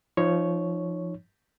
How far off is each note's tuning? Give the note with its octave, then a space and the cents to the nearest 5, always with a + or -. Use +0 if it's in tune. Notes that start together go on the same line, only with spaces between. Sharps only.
F3 -20 D#4 -20 C#5 +0